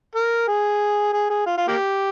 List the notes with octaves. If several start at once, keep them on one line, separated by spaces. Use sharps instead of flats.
A#4
G#4
G#4
G#4
F4
F4
A#3 G4